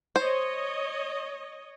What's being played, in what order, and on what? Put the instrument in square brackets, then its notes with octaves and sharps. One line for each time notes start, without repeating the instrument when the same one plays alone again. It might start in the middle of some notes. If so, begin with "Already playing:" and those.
[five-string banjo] C5 [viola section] C#5 D#5